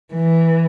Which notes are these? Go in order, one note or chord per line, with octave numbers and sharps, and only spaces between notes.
E3